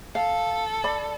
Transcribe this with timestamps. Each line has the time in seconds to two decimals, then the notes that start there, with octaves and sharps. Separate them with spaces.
0.15 A4 F5
0.84 D5 B5